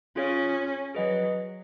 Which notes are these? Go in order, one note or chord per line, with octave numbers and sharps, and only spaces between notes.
C#4 F4 G#4 C#5 F5
F#3 G#4 B4 D#5 F#5